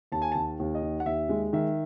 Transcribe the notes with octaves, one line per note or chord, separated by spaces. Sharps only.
D#2 A5
G#5
D#2 A5
D#2
D#5
D#3
F#5
D#2 E5
G#3
D#3 E5